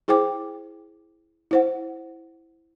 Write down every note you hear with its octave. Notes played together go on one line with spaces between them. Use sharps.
E4 G#4 C5 G5 D6
E4 C5 F#5